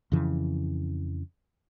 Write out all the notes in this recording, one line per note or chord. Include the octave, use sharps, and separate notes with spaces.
F2 C#3 E3